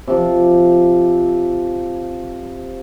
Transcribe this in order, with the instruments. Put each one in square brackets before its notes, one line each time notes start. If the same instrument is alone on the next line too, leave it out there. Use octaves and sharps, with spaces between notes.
[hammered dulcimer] C3 F3